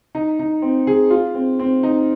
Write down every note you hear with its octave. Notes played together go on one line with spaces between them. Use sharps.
D#4
D#4
C4
G#4
F4
C4
C4
D#4